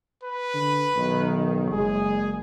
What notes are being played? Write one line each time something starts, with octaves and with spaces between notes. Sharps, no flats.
B4
D3
B1 D#3
F#1 G#3 G#4